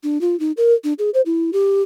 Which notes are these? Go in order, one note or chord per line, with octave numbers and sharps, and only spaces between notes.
D4
F4
D#4
A#4
D4
G#4
C5
E4
G4